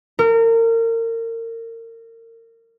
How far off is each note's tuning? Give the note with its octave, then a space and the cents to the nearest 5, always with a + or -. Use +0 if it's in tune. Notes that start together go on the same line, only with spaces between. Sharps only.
A#4 -30